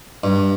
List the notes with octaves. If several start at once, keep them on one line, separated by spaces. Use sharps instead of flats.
G2